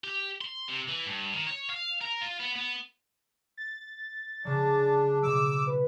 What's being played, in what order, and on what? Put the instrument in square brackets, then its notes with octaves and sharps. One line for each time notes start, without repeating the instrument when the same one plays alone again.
[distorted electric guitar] G4
C6
C3
E3
G2
D#3
C#5
F5
A#4
F4
B3
B3
[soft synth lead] A6
[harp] C#3 F#3 [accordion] D4
[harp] B2 F#3 [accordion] D6 E6
[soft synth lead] B4